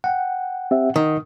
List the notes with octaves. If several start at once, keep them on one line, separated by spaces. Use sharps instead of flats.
F#5 G5
C4 G4 E5
D#3 D#6